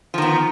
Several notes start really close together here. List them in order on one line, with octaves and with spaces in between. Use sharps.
F3 D#3 B3